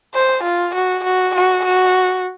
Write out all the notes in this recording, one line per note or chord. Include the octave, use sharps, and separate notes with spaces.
C5
F4
F#4
F#4
F#4
F#4